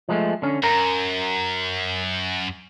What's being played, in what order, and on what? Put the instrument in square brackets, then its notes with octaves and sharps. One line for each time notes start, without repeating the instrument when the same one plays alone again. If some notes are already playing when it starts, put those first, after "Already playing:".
[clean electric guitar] F3 G#3 A3
D3 C#4
[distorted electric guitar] F#2 [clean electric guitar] A#4